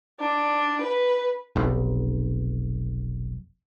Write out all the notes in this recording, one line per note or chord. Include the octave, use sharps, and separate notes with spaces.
D4
B4
F1 B1